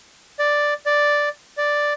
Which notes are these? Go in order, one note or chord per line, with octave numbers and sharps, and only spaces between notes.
D5
D5
D5